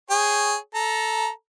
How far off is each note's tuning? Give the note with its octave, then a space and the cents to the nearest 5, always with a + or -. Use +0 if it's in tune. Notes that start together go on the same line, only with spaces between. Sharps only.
G#4 +0 C#5 -5 G5 +0
A4 +0 A#5 +15